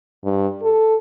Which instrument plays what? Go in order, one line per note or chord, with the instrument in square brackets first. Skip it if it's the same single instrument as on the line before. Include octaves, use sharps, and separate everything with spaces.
[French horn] G2
A4